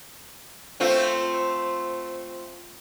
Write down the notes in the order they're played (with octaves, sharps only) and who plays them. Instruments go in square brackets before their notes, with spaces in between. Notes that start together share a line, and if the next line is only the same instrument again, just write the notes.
[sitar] A3 C4 F4